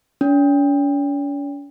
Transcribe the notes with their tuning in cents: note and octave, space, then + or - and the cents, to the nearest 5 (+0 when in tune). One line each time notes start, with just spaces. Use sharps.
C#4 +45